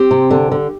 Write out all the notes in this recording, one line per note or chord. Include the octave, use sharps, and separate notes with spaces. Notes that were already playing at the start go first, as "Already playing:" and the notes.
Already playing: C4 G4
C3
D3
D3